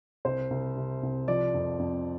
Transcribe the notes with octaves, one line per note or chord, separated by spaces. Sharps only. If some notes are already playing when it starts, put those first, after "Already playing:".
C2 C5
C2
C3
C2
F3 D5
F2
F2